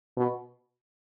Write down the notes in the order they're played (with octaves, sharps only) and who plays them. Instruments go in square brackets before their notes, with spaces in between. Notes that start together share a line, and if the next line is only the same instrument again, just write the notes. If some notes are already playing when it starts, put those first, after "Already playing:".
[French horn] B2